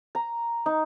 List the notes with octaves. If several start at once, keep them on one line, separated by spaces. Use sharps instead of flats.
A#5
D#4